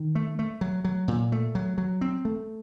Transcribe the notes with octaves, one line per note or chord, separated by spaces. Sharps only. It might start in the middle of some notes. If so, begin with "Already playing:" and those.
Already playing: D#3
A3
A3
F#3
F#3
A#2
A3
F#3
F#3
C4
A3